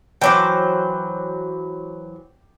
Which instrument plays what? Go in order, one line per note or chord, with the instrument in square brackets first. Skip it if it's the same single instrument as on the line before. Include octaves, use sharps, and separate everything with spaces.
[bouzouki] E3 F#3 C5 [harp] G5 D6